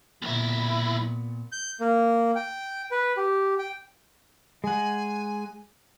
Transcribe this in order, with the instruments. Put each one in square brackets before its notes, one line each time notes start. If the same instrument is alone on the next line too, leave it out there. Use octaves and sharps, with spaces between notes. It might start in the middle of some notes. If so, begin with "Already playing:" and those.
[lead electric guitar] B1 E4 [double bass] A#2 B3
[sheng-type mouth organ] G6
A#3
G5
B4
G4
G5
[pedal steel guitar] G#3 F#5 [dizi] G#5